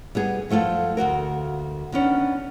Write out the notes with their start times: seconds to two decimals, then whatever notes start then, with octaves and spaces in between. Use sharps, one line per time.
0.15 G3 B3 G#4
0.49 F#2 F3 A3 F4 A4
0.97 D2 A#2 F#4 A#4
1.92 D#3 B3 C#4 D4